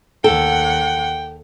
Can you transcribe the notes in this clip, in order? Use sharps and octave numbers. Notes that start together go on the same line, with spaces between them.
D#2 A4 F#5 G5